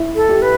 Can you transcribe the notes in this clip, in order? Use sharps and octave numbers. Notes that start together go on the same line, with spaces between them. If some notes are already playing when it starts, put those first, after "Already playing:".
Already playing: E4
A4
G4
B4